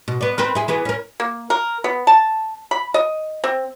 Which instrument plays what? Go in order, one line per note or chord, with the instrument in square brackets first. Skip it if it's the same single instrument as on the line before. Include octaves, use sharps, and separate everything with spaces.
[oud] B2
B3 D5
C4 A#4 B4
E4 G#4
E3 B3 G#4
C#4 A#4
[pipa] A#3
A#4
B3
A5
B5
D#5
C4